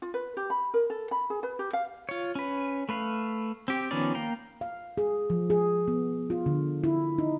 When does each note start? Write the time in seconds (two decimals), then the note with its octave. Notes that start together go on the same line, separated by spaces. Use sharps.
0.02 F4
0.14 B4
0.37 G4
0.50 B5
0.74 A#4
0.90 A4
1.11 B5
1.30 G#4
1.43 B4
1.59 G4
1.73 F5
2.09 F4 C#5
2.35 C#4 B4
2.89 A3 B4 F5
3.68 C4 G4
3.91 D#3 F3 B3 C#4 D5
4.15 A#3 F5 G5 A#5
4.61 F5
4.98 G#4
5.30 F3
5.50 G#4
5.88 B3
6.30 F4
6.46 D3
6.84 E4
7.18 D#4